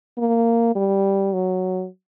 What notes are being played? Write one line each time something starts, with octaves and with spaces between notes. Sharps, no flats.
A#3
G3
F#3